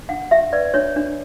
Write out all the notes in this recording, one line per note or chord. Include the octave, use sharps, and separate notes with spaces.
D4 F#5
G4 E5
B4 D5
D4 C#5
D4